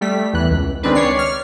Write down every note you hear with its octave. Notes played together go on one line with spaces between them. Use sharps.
G3 A3 B6
E2 E3 F#6
C#2
D#3 G#3 C4 D4 B4
C#5 D5 C7
F6